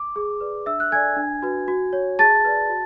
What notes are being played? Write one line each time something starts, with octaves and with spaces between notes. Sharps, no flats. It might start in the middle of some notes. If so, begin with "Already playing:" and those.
Already playing: D6
G#4
B4 D5
D4 E5 E6
F#6
A4 D5 G#5 G#6
D4
F#4 B4
F#4
C#5
G#4 A5 A6
B4 D5
F#4